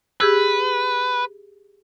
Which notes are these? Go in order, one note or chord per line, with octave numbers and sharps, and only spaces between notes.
G4 G#4 B4 E6